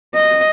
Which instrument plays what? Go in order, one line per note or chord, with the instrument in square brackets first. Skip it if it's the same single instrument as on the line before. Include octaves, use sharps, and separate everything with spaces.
[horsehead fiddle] D#5